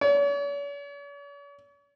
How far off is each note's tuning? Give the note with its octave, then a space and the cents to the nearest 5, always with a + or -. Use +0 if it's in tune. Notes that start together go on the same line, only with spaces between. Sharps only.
C#5 +45